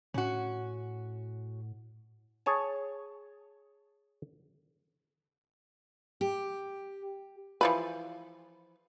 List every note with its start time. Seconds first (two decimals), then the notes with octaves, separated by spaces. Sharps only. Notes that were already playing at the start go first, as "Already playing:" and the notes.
0.14 A2 C#4 F#4
2.46 G#4 C#5 G#5 A5
6.21 G4
7.61 E3 F3 B4